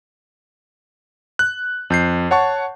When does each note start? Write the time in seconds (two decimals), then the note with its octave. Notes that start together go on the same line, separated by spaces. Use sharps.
1.39 F#6
1.90 F2 G6 C7
2.31 C#5 F#5 A5 C#6